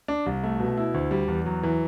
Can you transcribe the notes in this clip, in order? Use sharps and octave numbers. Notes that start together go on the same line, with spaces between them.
D4
C2
A3
B2
E4
D2
G3
E2
F#3
E3